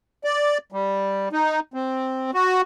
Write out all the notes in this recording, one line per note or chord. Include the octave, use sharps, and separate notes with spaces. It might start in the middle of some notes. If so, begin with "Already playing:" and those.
D5
G3
D#4
C4
F#4